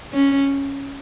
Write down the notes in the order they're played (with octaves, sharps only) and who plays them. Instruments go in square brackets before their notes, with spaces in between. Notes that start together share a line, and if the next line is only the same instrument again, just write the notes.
[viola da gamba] C#4